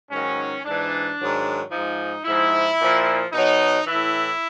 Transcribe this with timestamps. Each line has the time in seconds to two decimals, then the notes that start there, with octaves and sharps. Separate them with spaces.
0.10 G#2 D#3 F#3 C#4
0.65 G#2 E3 D4
1.18 G#2 D#3 F#3
1.71 G#2 F3 D#4
2.25 G#2 F3 E4
2.79 A#2 F3
3.33 B2 F#3 D#4
3.86 A2 E3 E4